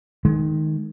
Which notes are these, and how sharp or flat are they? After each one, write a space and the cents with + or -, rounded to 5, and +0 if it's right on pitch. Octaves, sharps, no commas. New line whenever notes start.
D#3 +0 G#3 +25